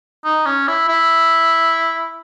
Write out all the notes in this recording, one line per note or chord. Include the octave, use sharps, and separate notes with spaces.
D#4
C#4
E4
E4